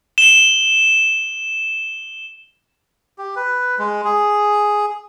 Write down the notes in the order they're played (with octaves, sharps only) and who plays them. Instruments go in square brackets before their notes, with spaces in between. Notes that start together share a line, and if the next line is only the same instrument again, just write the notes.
[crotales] E7 G7
[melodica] G4
B4
G#3
G#4